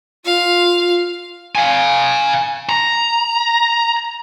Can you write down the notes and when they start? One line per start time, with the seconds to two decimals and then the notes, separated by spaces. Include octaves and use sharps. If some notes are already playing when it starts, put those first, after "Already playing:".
0.25 F4 F5
1.55 F5 G#5
2.69 A#5